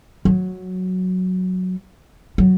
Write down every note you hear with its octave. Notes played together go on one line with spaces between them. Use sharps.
F#3
F#3